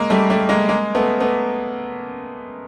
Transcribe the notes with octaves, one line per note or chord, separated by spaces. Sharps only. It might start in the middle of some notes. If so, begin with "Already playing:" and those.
Already playing: G#3 A#3
G3 A3
G3 A3
G#3 A#3
G#3 A#3
A3 B3
A3 B3